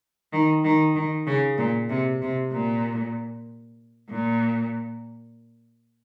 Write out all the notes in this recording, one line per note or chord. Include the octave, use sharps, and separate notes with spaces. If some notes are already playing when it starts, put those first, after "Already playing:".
D#3
D#3
D#3
C#3
A#2
C3
C3
A#2
A#2